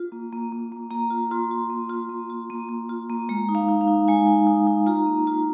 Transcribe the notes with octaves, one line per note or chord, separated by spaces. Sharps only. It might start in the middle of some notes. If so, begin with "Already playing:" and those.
Already playing: F4
A#3
A#3
A#3
A#3
A#3 A#5
F4
F4 C6
F4
A#3
F4
A#3
F4
A#3
A#3
F4
A#3
G#3 A#5
D#4
F5
D#4
F5
D#4
G#3 G#5
D#4
D#4
D#4
F4 A#5
A#3
F4